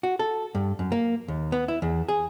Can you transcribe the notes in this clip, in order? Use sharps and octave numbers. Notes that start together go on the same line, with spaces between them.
F#4
A4
G2
F#2
A#3
D#2
B3
E4
E2
G#4